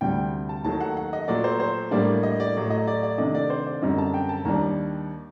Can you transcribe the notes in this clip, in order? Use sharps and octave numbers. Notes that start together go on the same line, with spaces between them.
D2 C3 G3 G5
A5
D#2 D#3 F#3 A3 A5
F#5
F#5
D#5
A#2 F#3 A3 D5
C5
C5
A2 G3 A#3 D4 D5
D#5
D5
A2 F#3 A3
D#5
D5
D5
C3 D#3 A3 D4 D#5
D5
C5
D5
F#2 D3 G3 C4 D#5
A5
G5
A5
D#2 D#3 G3 D4 A#5